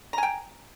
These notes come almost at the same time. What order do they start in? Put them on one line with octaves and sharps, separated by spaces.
A#5 G#5 G5